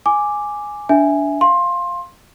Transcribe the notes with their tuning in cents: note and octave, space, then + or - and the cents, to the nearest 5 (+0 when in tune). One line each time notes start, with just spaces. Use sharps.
G#5 +0 D6 +0
D4 -20 E5 +0 G#5 +0
F5 +0 C6 +20